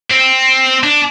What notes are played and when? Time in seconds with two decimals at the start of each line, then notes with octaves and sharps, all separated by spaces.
0.11 C4
0.83 D4